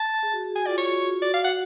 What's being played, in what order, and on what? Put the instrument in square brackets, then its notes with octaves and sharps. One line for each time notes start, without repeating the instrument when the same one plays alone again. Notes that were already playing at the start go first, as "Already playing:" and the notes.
Already playing: [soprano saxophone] A5
[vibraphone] G#4
F#4
G#4
[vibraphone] F#4 [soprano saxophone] G#5
[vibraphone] F4 [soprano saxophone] D5
[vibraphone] F#4 [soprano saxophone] C#5
[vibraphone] F#4 [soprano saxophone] D5
[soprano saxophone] F5
F#5